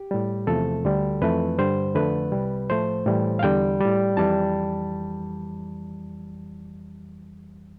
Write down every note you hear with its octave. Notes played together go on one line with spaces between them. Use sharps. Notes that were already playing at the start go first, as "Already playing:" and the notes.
Already playing: G4
A2 G3
E2 C3 F3 A3 A4
D2 D3 G3
F2 E3 A3 B4
G2 D3 G3 C5
F2 D3 F3 A3 B4
C2 C3 G3
A2 F3 A3 C5
A2 E3 G3
F5
E2 D3 G3 G5
A2 G3
F2 E3 G3 A5